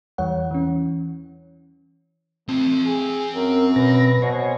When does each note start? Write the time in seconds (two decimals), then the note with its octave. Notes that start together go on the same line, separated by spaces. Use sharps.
0.18 E2 E3 G3 C#5 F#5
0.51 E3 C#4
2.49 A3 C4 A5
2.85 G#4
3.35 F#2 A#4
3.76 B2 B4 A#6
4.22 B2 C5 C#5 G#5